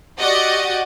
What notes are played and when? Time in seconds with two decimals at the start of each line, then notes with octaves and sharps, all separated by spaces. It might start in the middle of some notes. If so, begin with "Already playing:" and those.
0.19 F#4 G4 D5 D#5 F#5